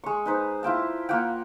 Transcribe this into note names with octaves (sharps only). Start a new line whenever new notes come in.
G#3 C#6
D#4 B4 C5
E4 F4 G5 A5
A#3 F4 F#5 G5